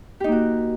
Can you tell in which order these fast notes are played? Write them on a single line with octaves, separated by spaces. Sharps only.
G4 D#4 A#3 F#4